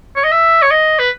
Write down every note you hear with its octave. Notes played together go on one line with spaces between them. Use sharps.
C#5
D#5
E5
C#5
D#5
B4